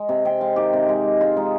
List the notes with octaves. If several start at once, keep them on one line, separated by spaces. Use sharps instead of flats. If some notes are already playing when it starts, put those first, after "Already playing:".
Already playing: G#3
C3
C3 G5
G#3 F5
D#3 G4
C3
G#3
G#3
G#3 F4
G#3 D#4